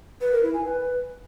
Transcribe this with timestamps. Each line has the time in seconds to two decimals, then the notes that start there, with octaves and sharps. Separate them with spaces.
0.21 B4
0.32 A#4
0.43 E4
0.54 G#5
0.65 B4